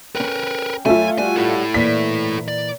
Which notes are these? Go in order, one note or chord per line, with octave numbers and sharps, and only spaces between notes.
C#4 A#4 B4 G5
F#2 A3 F4 G#4 E5 G#5
G3 F#4 G#5
E4 A4
A#2 E3 B6
D5